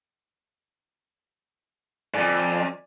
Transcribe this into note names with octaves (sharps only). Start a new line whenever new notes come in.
F2 G#2 D5 G#5 A6